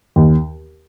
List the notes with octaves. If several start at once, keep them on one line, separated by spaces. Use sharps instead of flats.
D#2